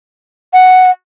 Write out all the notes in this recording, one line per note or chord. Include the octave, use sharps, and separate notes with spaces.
F#5